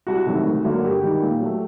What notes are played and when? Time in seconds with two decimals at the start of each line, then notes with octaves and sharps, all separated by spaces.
0.07 C2 F#4
0.26 C3 D#3 F#3 A3
0.45 D2
0.65 D3 F#3 A#3
0.84 G2 G4
1.03 D#3 G3
1.22 A#2
1.41 F#3 A3